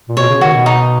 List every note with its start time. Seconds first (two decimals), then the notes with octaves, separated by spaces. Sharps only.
0.09 A#2
0.17 B2 C#5
0.29 C#3
0.41 D#3 F#4
0.53 B2
0.66 D#4